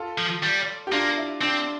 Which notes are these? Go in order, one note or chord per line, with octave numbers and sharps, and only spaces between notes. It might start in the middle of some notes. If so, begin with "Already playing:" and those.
Already playing: F4 A4
F3
G3
G4
A#3 D4 F4
E4
C4 D4